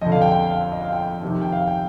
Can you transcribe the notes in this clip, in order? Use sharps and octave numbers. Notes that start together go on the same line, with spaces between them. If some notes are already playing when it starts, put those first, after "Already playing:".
F2 D3 D#5
F5
G5
G5
F5
D#5
F5
G5
F2 C3 D#3
G5
F5
G5